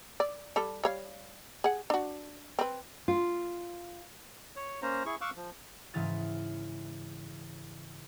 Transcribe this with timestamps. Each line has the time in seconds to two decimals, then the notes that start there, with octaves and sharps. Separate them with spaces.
0.20 D5
0.56 G3 G4 A4
0.84 G3 C#5 F5
1.64 G#4 F#5
1.90 D4 F#4
2.59 C4 B4
3.08 F4
4.56 C#5
4.82 A#3 C#4 C5 A#5
5.06 E4 G#4 C#6
5.21 F5 C#6 D6 E6 F#6
5.36 F3
5.93 G#2 C#3 E3 F6 A6 D#7